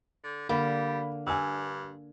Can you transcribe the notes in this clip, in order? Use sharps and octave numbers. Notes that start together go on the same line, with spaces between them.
D3
D3 G3 A#3 B5
G2 G#5 E6